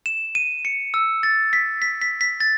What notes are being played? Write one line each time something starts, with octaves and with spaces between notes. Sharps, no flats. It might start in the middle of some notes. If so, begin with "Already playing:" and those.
E7
D#7
C#7
E6
A6
B6
B6
B6
B6
A6